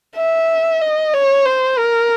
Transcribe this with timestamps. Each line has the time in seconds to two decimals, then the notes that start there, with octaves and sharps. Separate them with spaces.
0.16 E5
0.82 D#5
1.14 C#5
1.46 C5
1.78 A#4